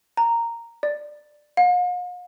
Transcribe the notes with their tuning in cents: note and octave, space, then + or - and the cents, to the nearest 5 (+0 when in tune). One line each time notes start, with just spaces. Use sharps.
A#5 -5
D5 +15
F5 +45